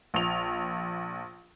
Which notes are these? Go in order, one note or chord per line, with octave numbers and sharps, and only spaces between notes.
A#1 F7